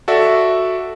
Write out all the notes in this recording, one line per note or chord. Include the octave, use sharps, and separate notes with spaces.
F#4 A4 D5 E5